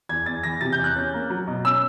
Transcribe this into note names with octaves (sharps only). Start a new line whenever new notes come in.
E2 G#6
E2 A6
E3 A#6
C3 A6
G6
E2
F#6
C#4
A#3
F#3
B2
C#4 E6